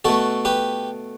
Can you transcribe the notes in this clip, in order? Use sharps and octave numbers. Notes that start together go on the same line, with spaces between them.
B2 A3 F#4 A4
G4 B4